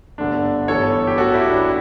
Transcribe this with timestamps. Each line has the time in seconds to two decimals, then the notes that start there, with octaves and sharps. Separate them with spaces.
0.18 G1 G2 D3 A3 D4
0.68 G1 G2 E3 G3 A4 C#5
1.07 G4
1.17 A1 A2 F#3 B3 F#4 A4
1.34 E4 G4
1.50 D4
1.61 E4